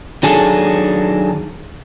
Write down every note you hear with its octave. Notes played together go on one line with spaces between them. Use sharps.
D#3 F#3 D4 G#4 A4